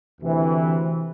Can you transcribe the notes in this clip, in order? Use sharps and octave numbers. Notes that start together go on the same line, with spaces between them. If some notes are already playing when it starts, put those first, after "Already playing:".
D2 C3 E3